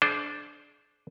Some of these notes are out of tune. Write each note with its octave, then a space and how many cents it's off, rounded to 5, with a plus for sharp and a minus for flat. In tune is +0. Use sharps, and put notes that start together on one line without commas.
D4 +0 G#4 +45 C5 +0